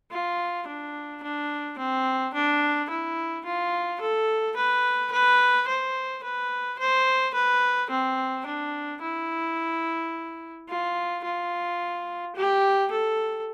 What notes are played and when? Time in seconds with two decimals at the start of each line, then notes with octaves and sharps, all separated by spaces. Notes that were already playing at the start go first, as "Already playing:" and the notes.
0.11 F4
0.67 D4
1.23 D4
1.78 C4
2.34 D4
2.89 E4
3.45 F4
4.01 A4
4.56 B4
5.12 B4
5.68 C5
6.23 B4
6.79 C5
7.34 B4
7.90 C4
8.46 D4
9.01 E4
10.69 F4
11.24 F4
12.35 G4
12.91 A4